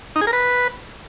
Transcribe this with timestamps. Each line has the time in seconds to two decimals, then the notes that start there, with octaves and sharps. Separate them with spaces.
0.16 D#4
0.21 G#4
0.27 A#4
0.33 B4